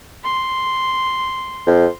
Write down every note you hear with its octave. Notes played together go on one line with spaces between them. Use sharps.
C6
F2